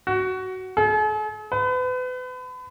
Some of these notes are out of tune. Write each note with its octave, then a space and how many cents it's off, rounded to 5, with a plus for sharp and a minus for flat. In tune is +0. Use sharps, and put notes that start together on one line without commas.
F#4 +15
G#4 +45
B4 +35